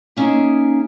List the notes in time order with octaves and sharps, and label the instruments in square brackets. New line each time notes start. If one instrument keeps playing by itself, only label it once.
[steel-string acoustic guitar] A#3 C#4 D#4 G#4 A#4 E5